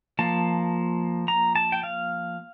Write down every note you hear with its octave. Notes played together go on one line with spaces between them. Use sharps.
F3 A#3 A5
A#5
A5
G5
F5